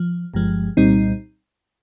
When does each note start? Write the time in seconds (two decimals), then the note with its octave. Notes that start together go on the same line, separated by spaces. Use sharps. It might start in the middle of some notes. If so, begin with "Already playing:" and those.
Already playing: F3
0.34 G1 G2 F3 G#3
0.77 C2 A#2 G3 C4 D#4